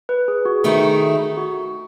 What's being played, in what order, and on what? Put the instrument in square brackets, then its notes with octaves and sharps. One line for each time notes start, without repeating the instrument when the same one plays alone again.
[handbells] B4
G#4
F#4
[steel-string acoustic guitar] D#3 A3 E4 [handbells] G#4
[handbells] F#4